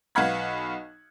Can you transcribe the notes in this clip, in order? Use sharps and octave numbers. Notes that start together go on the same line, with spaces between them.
B1 B4 F5 F#5 B5 G#6